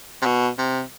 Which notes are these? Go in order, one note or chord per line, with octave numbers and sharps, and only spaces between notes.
C3
B2
C3